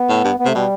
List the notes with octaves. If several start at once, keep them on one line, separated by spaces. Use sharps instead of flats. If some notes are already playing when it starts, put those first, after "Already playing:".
Already playing: B3
A2
G2
B3
C3 A3
B2 G3